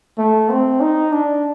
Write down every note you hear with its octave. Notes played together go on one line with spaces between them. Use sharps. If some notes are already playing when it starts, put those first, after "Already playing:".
A3
C4
D#4
D4